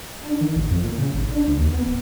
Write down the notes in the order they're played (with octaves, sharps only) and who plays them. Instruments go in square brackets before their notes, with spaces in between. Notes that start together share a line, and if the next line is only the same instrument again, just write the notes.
[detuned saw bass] D4
D#3
A1
F2
A#2
C#3
G#1
D4
C#2
D#2
B3
D1